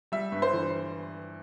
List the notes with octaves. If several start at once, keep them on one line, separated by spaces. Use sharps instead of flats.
G3 E5
G2
C5
E3